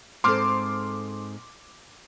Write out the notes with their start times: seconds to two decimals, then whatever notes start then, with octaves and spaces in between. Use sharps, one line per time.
0.24 G#2 C4 A4 C6 D6 F6